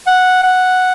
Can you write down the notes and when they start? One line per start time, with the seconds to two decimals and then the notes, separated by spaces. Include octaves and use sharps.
0.07 F#5
0.43 F#5